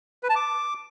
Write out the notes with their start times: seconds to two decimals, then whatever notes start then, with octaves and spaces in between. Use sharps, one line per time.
0.23 B4
0.29 A5
0.36 D6